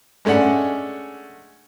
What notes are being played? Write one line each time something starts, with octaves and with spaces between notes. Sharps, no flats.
G#3 A3 C#4 D4 F#5